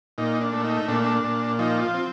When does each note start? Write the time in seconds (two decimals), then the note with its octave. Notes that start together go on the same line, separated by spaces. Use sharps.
0.18 A#2 D#4
0.41 D4
0.53 A3
0.65 D#4
0.88 A#2 D4
1.04 D4
1.24 A#2
1.59 F3 D#4
1.82 F4
1.94 C4